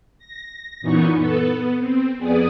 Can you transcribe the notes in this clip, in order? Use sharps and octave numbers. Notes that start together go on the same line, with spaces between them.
A#6
F#2 A#2 E3 B3 D#4 C#6
B3 A4 B4
B3
C4
F2 B3 G#4 D5 D#6